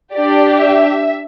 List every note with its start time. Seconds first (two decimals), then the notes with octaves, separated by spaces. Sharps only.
0.14 D4 G4 D5
0.61 E5